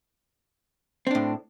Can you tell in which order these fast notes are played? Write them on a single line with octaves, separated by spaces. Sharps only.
C4 D4 A2